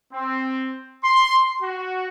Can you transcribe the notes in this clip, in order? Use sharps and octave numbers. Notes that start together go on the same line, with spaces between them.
C4
C6
F#4